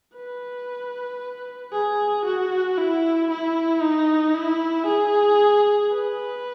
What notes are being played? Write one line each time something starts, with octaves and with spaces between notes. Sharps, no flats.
B4
G#4
F#4
E4
E4
D#4
E4
G#4
B4